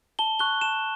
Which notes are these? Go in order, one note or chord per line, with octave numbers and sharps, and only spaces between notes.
A5 G7
C#6 F#6 G7
A5 E7